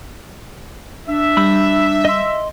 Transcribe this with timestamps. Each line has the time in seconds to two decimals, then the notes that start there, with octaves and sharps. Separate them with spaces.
1.07 D4 E5
1.37 G3 B5 E6
2.05 D#5 C6